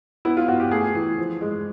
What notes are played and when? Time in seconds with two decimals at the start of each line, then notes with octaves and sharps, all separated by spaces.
0.25 B3 E4
0.37 F4
0.48 B3 F#4
0.60 G4
0.71 A3 G#4
0.95 E3
1.18 F3
1.41 G#3